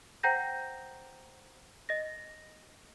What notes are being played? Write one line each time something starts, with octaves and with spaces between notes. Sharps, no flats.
C5 F#5 G5 A#5 G6 A#6
D#5 A#6